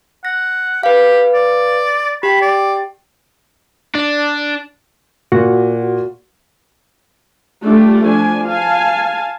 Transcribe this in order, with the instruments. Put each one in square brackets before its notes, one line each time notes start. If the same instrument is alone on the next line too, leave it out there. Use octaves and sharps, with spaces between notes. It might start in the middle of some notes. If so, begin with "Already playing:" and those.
[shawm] F#5 [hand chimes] A#6
[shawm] G4 [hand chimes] B4 F5
[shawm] D5
[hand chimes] G4 G5 [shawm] B5
[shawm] D5
[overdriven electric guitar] D4
[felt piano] A#2 [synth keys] F#4
[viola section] G3 A3 D4 F4 G4
F3 D4 G#5
F5 G#5 A5